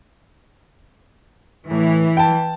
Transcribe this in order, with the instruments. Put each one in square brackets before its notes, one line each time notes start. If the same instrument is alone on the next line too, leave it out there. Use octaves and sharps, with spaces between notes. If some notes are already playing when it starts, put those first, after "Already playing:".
[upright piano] A2 [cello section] E3
[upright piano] G5 A5